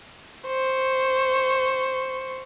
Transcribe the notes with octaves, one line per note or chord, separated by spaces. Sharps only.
C5 C#6